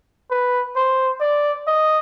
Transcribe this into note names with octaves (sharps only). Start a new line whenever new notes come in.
B4
C5
D5
D#5